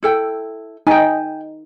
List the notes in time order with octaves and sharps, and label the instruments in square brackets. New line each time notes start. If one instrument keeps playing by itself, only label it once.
[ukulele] E4 A4 G5
[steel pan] D#4 [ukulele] G5 G#5